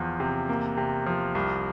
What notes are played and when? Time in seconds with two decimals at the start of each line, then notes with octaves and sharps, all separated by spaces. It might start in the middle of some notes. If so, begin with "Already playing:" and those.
Already playing: E2 F3
0.20 C3
0.49 A#3
0.77 C3
1.06 F3
1.35 C2